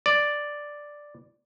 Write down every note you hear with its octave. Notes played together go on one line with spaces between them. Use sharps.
D5